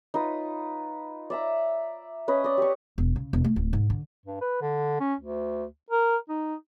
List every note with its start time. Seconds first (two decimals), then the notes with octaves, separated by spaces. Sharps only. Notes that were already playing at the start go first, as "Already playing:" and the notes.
0.14 D#4 F4 B4 D#5
1.30 D5 E5 A#5
2.28 C#4 B4 D#5
2.44 D5 D#5
2.58 G4 C#6
2.98 E1
3.16 C#3
3.33 E1
3.44 A3
3.56 D1
3.73 G#2
3.90 D3
4.26 G2
4.41 B4
4.62 D3
5.00 C#4
5.21 D2
5.90 A#4
6.29 D#4